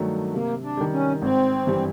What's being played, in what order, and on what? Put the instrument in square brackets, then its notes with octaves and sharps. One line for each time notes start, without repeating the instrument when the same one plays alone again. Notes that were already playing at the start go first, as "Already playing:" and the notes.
Already playing: [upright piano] G2 D#3 F#3 A3 D4
[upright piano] C3 [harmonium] A#3
[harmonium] D4
[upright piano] D#3 G3
[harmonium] C#4
[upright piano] G#1 [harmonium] C4
[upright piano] G2 E3 G3